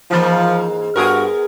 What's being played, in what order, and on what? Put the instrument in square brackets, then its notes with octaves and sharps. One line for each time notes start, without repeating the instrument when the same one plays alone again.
[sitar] G#2 E3 A#3 [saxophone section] F3
[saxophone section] G2 F#4 [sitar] B3 G#4 A#4